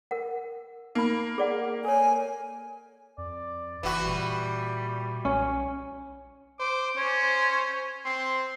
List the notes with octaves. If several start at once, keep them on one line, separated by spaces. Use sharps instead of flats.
A#4 F#5
A#3 D#4 B5
G#4 D5 F#5
A4 C#5 G#5
F2 D5
F#1 E3 F#4 B4
A#2 G3
B1 C#4
C5 D6
C#4 C5
C4 C6